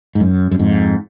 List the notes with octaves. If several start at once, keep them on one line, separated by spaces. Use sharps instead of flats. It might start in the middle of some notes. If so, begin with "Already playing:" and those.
G#2
F#2
F#2
F2 G#2